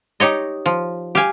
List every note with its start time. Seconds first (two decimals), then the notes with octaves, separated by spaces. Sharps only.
0.20 D#4 G4 C#5 D#5
0.66 F3
1.15 G4 F5 G#5